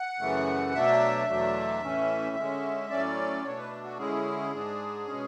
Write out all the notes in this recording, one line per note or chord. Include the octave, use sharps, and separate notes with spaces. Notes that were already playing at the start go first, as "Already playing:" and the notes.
Already playing: F#5
F#2 C#3 E3 A3
B2 F#3 A3 D4 E5
E2 B2 F#3 A3 D4
A2 E3 A3 C#4
D3 G#3 C#4
A2 F#3 A3 C#4 D5
B2 A3 D4 C#5
B4
F#4
D3 G#3 C#4 E4 G#4
G#2 G#3 D4
B2 G#3 C#4